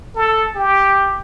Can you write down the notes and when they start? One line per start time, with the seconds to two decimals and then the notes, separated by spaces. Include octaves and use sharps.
0.15 A4
0.56 G4